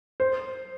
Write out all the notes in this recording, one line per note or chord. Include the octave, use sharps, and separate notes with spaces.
C5